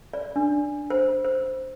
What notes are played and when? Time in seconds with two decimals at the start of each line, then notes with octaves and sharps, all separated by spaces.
0.14 D5
0.36 D4
0.90 C5
1.24 C5